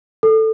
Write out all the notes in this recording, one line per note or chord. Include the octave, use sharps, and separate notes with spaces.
A4